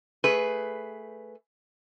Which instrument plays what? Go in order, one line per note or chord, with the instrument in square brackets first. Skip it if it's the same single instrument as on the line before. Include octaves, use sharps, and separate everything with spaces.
[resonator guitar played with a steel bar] A3 G#4 B4